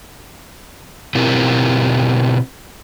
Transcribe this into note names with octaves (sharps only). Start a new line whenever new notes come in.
B2 C4 E4 F4 G4 A#4